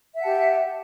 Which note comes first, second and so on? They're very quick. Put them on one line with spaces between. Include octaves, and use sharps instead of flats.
E5 F#5 A5 G4